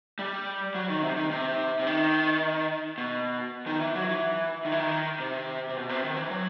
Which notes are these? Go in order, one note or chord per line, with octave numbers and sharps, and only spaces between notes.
G3
F#3
D#3
C3
D#3
C3
C3
D#3
B2
D#3
E3
F#3
E3
D#3
E3
D#3
C3
C3
B2
C3
D#3
E3
F#3